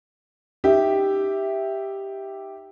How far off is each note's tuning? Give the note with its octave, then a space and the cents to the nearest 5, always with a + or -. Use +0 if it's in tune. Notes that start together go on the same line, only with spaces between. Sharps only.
D#4 +0 G4 +0 E5 +0